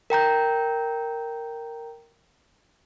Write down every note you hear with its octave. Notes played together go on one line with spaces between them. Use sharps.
A#4 G5 A#5 G6